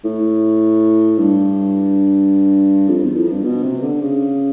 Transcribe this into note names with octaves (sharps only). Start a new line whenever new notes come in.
A2
G2
F2
E2
F2
G2
B2
C3
D3
C#3